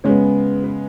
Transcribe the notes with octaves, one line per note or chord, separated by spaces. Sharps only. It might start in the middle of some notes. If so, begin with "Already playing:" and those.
C#3 G#3 B3 C#5
B4